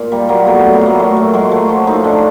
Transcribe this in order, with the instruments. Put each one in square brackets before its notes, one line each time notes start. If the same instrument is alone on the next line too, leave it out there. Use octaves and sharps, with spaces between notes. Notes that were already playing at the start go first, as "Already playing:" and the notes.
Already playing: [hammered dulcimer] A#2
G3 A#3
F#3 A#3
A2 B3
F#3
B3
A2 A#3
F#3 A3
A#2
F#3 G#3
F#3 A3
F3 A#3
A2 D#4
A2 D4